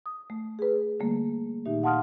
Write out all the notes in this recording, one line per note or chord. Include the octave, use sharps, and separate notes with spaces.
D#6
A3
G#4 B4
D3 G3 A3 A#3
A#2 D#3 D#4 G4 E5
F5 F#5 A5 C6 D#6 F6